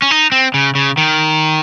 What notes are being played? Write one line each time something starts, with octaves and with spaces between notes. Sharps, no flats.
C#4
D#4
C4
C#3
C#3
D#3